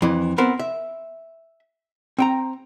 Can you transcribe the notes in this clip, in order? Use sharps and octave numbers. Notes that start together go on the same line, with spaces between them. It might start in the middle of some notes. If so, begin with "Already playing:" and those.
F2 E3
B3 C4 A#4 C5
E5
C4 G5 A#5